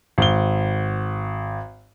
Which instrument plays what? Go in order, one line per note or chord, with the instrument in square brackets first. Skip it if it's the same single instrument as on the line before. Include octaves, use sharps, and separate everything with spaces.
[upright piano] G#1 G7